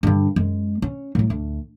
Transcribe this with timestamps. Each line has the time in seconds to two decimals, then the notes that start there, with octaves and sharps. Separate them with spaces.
0.03 G2 D3
0.36 F#2 G#3
0.82 C#4
1.15 A2 F#3
1.30 D2